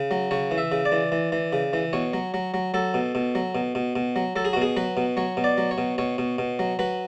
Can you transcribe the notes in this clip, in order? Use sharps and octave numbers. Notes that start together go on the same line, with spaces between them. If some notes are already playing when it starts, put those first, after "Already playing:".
Already playing: C#3
F#3
C#3 C#5
E3
E5
C#3
D5
E3
E3
E3
C#3
E3
B2 C#5
F#3
F#3
F#3
F#3 A4
B2
B2
F#3
B2
B2
B2
F#3
F#3 A4
G#4
B2 F#4
G#4
F#3 B4
B2
F#3 C#5
B2
D5
F#3
C#5
B2
B2 C#5
B2
B2
F#3
F#3 B4